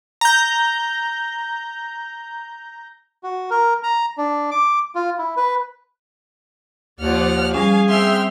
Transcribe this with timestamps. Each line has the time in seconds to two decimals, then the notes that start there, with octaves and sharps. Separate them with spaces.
0.21 A#5 G6
3.23 F#4
3.50 A#4
3.83 A#5
4.18 D4
4.51 D6
4.95 F4
5.19 E4
5.37 B4
7.00 D#2 F3 D5 F#5 F6
7.54 G3 C#4 G#4 F5 G#5
7.89 C4 E5 G5 C6 F6